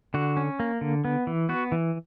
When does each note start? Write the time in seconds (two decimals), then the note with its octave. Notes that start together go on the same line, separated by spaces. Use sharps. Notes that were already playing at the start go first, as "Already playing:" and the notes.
0.14 D3 F#4
0.37 C#4
0.60 A#3
0.81 D3
1.05 B3
1.27 E3
1.49 B3 F#4
1.72 E3